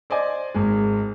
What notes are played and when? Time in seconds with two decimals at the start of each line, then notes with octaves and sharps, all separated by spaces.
0.10 C5 D5 D#5 G#5
0.54 G#1 G#3